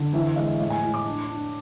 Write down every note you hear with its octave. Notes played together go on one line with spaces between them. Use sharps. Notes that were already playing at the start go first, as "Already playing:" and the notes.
Already playing: D3
E3 E5
E5
G#3 F5
E5
A2 F5
G#5
A2
D6
D4
D4